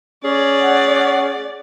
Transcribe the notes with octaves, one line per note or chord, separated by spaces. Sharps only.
C#4 G#4 D5
F#5